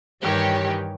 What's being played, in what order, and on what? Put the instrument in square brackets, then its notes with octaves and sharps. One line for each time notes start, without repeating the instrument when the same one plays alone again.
[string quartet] G2 D#3 E3 [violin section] G4 C#5